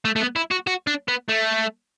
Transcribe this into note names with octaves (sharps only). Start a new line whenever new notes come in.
A3
A3
B3
E4
F#4
F#4
D4
B3
A3